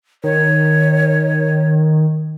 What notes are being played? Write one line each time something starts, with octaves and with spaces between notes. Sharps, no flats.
D#3 C#5